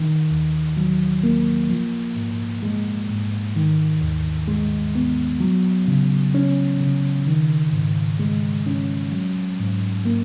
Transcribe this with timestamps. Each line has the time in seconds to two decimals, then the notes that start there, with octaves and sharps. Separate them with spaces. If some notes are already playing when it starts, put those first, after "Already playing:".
Already playing: D#3
0.31 D#2
0.77 F#3
1.24 A#3
1.70 F3
2.16 G#2
2.63 G#3
3.09 G#2
3.56 D#3
4.01 D#2
4.48 G#3
4.95 B3
5.40 F#3
5.88 C#3
6.34 C#4
6.80 C#3
7.27 D#3
7.73 G#2
8.20 G#3
8.66 C#4
9.12 F#3
9.59 G#2
10.05 A#3